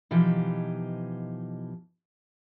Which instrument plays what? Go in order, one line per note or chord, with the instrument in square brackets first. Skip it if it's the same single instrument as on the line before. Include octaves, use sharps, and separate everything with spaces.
[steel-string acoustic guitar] B2 E3 F3 D#4 G4